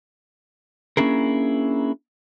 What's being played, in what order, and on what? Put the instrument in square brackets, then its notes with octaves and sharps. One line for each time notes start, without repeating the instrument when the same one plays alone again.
[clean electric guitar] A#3 C#4 D4 E4 G#4 A#4